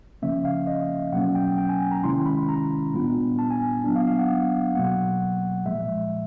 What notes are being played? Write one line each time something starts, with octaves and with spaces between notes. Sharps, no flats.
C#3 F3 A#3 C#4 E5
F5
D#5
B2 F#3 A#3 C#4 F#5
G5
G5
G#5
A#5
C3 D#3 G#3 C#4 E4 C6
B5
A#5
A#2 G3 B3 D4 F4
A5
G#5
F#3 B3 D4
F5
F5
F#5
B2 F#3 A#3 F#5
A#2 F3 G#3 E5